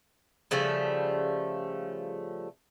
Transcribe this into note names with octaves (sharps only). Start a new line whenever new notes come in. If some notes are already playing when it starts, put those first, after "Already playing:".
C#3 F3 G3 A3